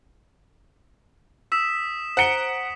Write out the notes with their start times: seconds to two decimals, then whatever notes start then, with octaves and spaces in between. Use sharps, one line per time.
1.52 D#6 E6 B6 E7
2.17 C5 F#5 A#5 C#7 D7 G7